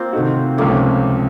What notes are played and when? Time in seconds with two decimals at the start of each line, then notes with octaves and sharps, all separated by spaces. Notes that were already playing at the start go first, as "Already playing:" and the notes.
Already playing: A#3 C4 F4
0.13 C3 D#3 A3 D#4 F#4
0.58 C#2 C3 F3 A3 A#3 C#4